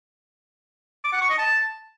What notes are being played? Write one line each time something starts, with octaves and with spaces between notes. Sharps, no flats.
D6
F#5
C#6
D#5
A5